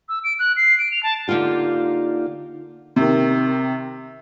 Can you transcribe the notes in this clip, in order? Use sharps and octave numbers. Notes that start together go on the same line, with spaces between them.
E6
D7
F#6
C7
D7
F7
A5
D3 A#3 D#4 F4 G4
C3 D#3